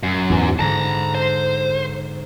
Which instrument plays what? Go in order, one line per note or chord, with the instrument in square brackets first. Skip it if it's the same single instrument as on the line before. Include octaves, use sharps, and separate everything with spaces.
[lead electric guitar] F#2
[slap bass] E2 G#2 E3
[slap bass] G#2 D3 [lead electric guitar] A5 A#5
[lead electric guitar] C5